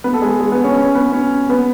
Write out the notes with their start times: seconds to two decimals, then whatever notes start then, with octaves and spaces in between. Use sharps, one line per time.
0.04 B3 B4
0.13 A4
0.22 G#3 G#4
0.40 G#3 G#4
0.52 B3 B4
0.64 C#4 C#5
0.77 C#4 C#5
0.95 B3 B4
1.12 C#4 C#5
1.49 B3 B4